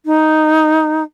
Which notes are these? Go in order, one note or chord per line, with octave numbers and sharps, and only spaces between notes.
D#4